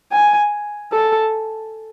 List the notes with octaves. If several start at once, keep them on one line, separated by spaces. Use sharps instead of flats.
G#5
A4